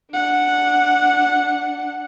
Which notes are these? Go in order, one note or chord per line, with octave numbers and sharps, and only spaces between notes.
D4 F#5